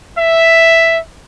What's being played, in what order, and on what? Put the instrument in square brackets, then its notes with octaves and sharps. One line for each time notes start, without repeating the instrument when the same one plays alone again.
[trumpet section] E5